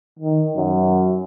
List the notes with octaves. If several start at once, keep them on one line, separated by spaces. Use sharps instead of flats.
D#3
F#2